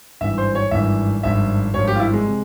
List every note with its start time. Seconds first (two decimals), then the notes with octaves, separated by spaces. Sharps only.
0.21 G#1 G2 E3 E5
0.38 C5
0.55 C#5
0.71 G#1 G2 E3 E5
1.23 G#1 G2 F3 E5
1.74 G#1 G2 F3 C#5
1.87 G4
1.96 F4
2.00 E4
2.13 G#3
2.26 C3